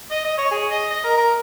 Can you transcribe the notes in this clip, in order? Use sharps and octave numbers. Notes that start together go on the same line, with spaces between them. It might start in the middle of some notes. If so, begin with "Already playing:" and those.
D#5
D#5
C#5
G#4
D#5
D#5
A#4
A#4